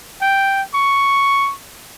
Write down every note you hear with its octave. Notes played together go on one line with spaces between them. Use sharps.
G5
C#6